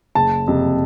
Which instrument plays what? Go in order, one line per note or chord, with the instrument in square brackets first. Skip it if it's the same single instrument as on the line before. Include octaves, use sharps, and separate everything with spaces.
[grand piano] F#1 A5
F2 C3